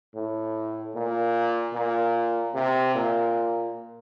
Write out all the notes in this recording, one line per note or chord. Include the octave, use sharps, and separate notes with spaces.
A2
A#2
A#2
C3
A#2